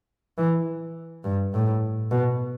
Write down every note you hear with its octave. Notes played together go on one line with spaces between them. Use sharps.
E3
G2
A2
B2